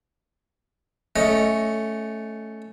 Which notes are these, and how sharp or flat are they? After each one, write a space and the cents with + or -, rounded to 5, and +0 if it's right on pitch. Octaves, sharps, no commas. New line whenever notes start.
A3 -5 C#4 +5 D#5 +10